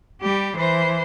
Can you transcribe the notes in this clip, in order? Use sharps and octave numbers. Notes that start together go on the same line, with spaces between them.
G3 G4
E3 C5